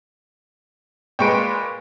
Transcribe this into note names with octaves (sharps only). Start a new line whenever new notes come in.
A#2 G#3 B4 G5 C#6 D7